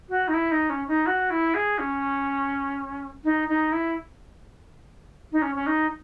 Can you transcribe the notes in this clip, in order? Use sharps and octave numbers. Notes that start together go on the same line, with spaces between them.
F#4
D#4
E4
D#4
C#4
D#4
F#4
E4
G#4
C#4
D#4
D#4
E4
D#4
C#4
C#4
D#4